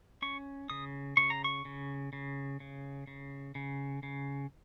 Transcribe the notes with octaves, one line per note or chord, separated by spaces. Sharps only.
C#4 C#6
C#3 D#6
C#3 C#6
A#5
C#6
C#3
C#3
C#3
C#3
C#3
C#3